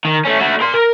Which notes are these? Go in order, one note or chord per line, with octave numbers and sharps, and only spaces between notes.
D#3
A3 C#4
A3 F#4
A#4 C6
A#4